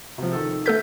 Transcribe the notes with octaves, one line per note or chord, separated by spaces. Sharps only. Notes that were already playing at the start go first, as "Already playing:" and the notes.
C3 F3
D#3 A4
A3 A4 G6 B6